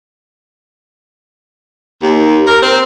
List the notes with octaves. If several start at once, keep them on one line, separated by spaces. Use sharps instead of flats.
D#2
A#4
C4